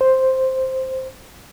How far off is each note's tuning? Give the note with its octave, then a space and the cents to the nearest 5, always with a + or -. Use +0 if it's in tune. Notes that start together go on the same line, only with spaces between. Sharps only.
C5 +0